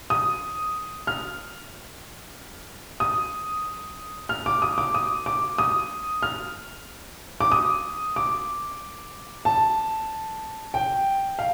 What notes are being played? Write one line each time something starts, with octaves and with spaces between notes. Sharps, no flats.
D#6
F6
D#6
F6
D6
D#6
D6
D#6
D6
D#6
F6
D6
D#6
D6
A5
G5
F5